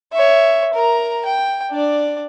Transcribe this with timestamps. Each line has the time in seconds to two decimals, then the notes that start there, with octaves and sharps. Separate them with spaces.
0.13 C#5 E5
0.73 A#4 A#5
1.26 G5
1.71 D4 D5